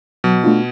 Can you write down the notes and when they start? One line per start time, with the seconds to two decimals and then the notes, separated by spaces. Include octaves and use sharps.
0.24 B2 F#3
0.44 A3 D4 F4